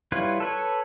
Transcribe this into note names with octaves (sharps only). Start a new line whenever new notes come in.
G3 E4 F4 B4 C#5
A4 B4 C#5